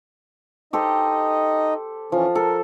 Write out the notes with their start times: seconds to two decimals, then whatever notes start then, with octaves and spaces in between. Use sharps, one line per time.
0.73 D#4 G4 A4 C5 D#5
2.12 E3 F3 C#4
2.35 A4 A#4